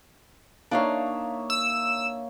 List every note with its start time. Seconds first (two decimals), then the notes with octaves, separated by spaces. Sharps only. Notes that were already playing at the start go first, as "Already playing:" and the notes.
0.71 A#3 D4 D#4 C#5 E5 F5
1.50 E6